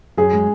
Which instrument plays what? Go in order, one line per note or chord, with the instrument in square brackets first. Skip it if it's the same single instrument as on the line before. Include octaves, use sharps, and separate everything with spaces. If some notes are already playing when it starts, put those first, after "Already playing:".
[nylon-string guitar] F#2 [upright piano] G#4
[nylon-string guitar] G#3